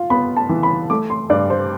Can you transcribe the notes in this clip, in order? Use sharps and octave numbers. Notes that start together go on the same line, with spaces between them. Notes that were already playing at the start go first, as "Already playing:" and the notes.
Already playing: F4
B3 B5
A5
E3
B5
A3 D6
C6
G2 D5
C5